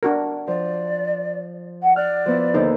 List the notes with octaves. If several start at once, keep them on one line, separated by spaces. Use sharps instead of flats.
D4 F#4 A#4
F3 D5
F#5
D5 F6 F#6
F3 B3 E4
D#2 D3 D#4 C5